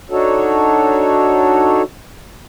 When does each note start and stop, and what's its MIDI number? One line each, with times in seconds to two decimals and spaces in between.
0.10 1.83 62
0.10 1.83 63
0.10 1.83 66
0.10 1.83 69
0.10 1.83 73